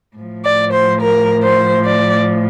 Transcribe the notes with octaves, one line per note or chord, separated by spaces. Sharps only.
A2 F3
D5
C5
A#4
C5
D5